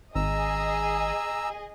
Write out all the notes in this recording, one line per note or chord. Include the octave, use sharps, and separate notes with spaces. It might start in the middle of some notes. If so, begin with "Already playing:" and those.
G#1 G#4 D#5 A#5 E6